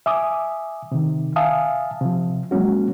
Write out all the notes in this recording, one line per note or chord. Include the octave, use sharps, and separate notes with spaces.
E5 G#5 D6 D#6
C3 D#3
E5 F5 G#5 A5 D#6
C3 F3
F#3 G#3 A#3 C#4 F#4